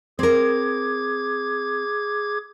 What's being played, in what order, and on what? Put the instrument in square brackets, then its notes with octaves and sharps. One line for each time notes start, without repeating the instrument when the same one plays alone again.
[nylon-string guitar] C4 A#4 [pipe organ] G#4 D6 G#6